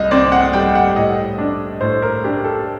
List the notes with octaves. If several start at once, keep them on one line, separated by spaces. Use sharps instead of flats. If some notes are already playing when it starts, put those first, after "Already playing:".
Already playing: C2 D#5
C4 D5
F#5
G3 G5
F#5
A2 D#5
D4
A2 C5
A#4
D4 G4
A4